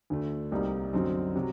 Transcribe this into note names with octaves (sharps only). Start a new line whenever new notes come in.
D2 D3 A3
C2 C3 G3 A#3 D#4
F#2 D3 F#3 C4 D#4
C3 F#3